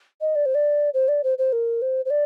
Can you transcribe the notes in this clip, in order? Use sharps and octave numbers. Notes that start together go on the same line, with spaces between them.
D#5
D5
C5
D5
C5
D5
C5
C5
A#4
C5
C5
D5